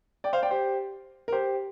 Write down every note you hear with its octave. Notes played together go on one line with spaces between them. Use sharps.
D5 G5
C5 F5
D5 G5
G4 C5
A#4
G4 C5